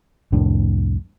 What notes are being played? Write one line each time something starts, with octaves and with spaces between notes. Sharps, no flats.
C2 F2 A2 D4